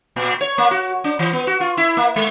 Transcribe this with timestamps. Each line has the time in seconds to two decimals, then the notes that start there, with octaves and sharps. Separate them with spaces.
0.16 A#2
0.41 C#5
0.58 A#3
0.71 F#4
1.04 D4
1.19 E3
1.33 B3
1.47 F#4
1.60 F4
1.77 E4
1.97 A#3
2.16 G#3